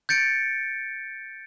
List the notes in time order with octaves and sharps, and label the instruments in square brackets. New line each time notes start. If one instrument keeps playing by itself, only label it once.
[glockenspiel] G6 A6 C#7 D7